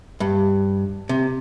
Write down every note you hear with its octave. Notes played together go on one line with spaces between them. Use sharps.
G2
C3